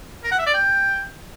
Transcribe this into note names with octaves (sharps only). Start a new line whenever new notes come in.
A#4
F#5
E5
D5
G5